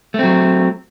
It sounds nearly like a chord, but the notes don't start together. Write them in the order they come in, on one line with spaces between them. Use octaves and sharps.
A3 C4 F#3